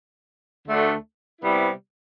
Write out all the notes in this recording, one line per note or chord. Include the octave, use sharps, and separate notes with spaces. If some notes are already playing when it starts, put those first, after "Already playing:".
D2 D3 A3 D4
C3 G3 B3 E4